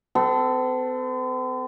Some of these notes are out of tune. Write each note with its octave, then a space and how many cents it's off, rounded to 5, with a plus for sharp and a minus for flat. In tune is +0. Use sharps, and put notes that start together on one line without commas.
C4 -45 A4 +0